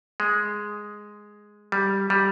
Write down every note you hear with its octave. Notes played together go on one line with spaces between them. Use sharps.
G#3
G3
G3